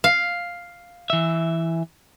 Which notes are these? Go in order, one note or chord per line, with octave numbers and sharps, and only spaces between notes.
F5
E3 E5